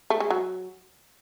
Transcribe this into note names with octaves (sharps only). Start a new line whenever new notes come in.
A3
G#3
F#3